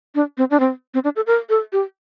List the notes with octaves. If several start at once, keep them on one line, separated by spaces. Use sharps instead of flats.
D4
C4
D4
C4
C4
D4
A4
A#4
A4
G4